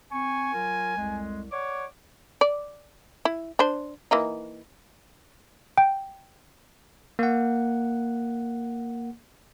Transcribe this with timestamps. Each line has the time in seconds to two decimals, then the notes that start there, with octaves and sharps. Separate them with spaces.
0.12 C4 G#5 C#6
0.54 F#3 F4 A#4
0.96 C2 F2 G#3
1.52 C#5 D5 F#5 D6
2.41 D5
3.25 E4
3.59 D4 C5
4.11 E3 A#3 D#4
5.78 G5
7.19 A#3 F#5